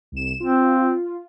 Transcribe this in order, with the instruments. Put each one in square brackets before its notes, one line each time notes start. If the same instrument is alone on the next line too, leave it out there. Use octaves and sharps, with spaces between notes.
[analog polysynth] C2 E7
[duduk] C4 [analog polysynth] F4